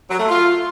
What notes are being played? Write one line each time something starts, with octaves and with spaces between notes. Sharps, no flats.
F#3
A3
F4